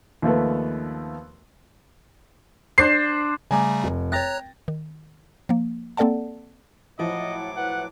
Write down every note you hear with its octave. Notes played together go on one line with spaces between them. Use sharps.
D#2 F3 A3 B3
D4 C5 C7
C#3 G3 A3 G#5 A#5 D6
F1
C#5 G5 A#5 F#6 A6 A#6
D#3
F3 A#3
A#3 C4 A4 D5 F#5 A5
A2 F3 F#3 E4 D#5 F#5 D6
B4 F#5